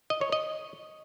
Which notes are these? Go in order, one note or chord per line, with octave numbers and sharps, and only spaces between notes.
D#5
C#5
D#5